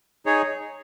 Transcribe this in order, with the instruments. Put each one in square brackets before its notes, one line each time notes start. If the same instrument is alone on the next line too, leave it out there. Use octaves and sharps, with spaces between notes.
[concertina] D#4 G#4 C#5